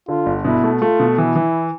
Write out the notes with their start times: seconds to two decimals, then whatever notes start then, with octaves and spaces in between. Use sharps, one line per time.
0.08 D3 F4
0.26 G1
0.45 B2 E4
0.64 A3
0.81 A3 F4
1.00 B2
1.17 E3 E4
1.35 E3